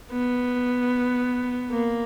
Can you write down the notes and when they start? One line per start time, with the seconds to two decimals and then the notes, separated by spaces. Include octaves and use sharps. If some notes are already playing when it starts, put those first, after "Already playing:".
0.12 B3
1.71 A#3